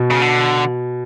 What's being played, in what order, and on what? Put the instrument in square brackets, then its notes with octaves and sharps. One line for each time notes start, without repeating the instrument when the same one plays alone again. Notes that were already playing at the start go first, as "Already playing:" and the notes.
Already playing: [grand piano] B2
[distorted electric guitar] C#3
D3